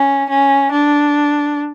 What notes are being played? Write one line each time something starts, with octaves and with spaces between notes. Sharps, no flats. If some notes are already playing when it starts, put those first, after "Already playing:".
Already playing: C#4
C#4
D4